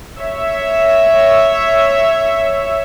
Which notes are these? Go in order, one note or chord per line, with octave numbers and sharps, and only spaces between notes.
C#5 E5